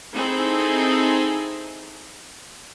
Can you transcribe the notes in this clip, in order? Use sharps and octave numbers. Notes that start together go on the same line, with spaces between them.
C4 D#4 E4 G#4 A4